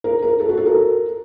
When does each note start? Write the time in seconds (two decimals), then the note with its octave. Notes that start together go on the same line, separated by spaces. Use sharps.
0.04 A#4
0.22 A#4
0.40 A4
0.49 F#4
0.57 A4
0.66 A#4